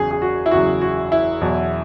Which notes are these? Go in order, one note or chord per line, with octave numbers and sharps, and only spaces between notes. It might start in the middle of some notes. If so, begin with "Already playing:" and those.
Already playing: F#1 E2 C#3 F#3 F#4 G#4
G#4
F#4
E4
F#1 E2 C#3 F#3 F#4
F#4
E4
E2 B2 F#3